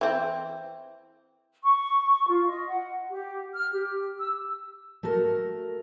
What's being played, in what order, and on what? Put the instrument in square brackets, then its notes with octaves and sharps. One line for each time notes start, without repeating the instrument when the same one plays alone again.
[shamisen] E3 C4
[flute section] C#6
F4
D#5
F#5
G4
F6
G4
E6
[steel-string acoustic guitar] A3 F#4 A4 A#4